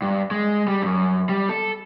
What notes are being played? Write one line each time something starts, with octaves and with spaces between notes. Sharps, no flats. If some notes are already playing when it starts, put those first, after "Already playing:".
G2
G#3
G3
F#2
G3
A4